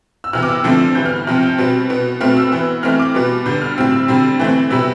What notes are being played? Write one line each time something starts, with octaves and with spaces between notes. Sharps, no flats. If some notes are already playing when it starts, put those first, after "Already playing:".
E6
C3 E3 B3 F6
D6
E6
D3 F3 A3 C4
E3 G3 B3 G6
F6
F6
C3 F3 C4 F6
G6
B2 G3 C4
B2 B3
B2 A3 C4 F6
E6
E3 B3
E3 A3 C4 F6
D6
B2 G3 B3
D3 G3 B3 G6
F6
A2 G3 C4 E6
E6
D3 G3 C4
E3 A3 C4
C3 G3 B3 E6